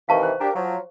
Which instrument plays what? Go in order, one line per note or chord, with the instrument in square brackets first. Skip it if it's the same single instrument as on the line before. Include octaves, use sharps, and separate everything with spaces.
[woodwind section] C3 D#3 E3 [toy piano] F5 A5 C#6
[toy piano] C5
[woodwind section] D4 G4 A#4
F3 F#3